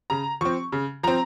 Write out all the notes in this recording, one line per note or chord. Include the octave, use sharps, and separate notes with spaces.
C#3 A#5
F3 C4 C#6
C#3
F3 C4 A#5